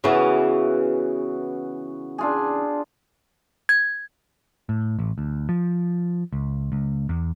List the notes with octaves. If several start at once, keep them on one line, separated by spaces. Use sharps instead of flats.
C#3 E3 B3 F#4
D4 F4 G#4
G#6
A2
A1
D2
F3
C#2
C#2
E2